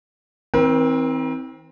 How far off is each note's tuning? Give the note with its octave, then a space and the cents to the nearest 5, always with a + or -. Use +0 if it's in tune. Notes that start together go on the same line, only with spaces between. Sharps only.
E3 -45 C4 +0 A#4 +40